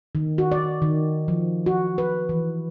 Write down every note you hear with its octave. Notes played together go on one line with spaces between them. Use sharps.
D#3
F#4
D5
D#3
F3
F#4
B4
E3